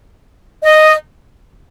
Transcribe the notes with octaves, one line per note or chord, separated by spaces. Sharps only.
D#5